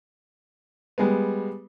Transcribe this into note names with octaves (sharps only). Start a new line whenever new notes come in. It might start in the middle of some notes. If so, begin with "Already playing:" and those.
G3 G#3 B3